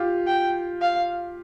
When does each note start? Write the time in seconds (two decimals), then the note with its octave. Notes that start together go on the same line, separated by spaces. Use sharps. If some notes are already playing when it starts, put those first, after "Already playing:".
Already playing: F4 G4
0.27 G5
0.82 F5